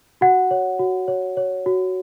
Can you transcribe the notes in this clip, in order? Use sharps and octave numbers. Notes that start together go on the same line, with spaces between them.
F#4 F#5
C#5
F#4
C#5
C#5
F#4